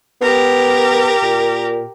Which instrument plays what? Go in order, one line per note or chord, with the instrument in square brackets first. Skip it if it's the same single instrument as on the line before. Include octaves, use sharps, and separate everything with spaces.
[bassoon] B3 [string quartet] G4 A#4
[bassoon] A#2